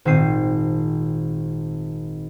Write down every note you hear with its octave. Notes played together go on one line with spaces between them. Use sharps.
G#1 A#2 C4 C7 D#7